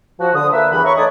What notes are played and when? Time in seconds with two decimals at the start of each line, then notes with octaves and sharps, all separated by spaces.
0.20 F3 F#4
0.34 D3 D#6
0.52 A#3 B4 E5
0.71 E2 G2 E3 F#5 B5
0.84 C#5 E5 A#5 B5 C#6
0.97 A3 D#4 C#5 D5 A5 D#6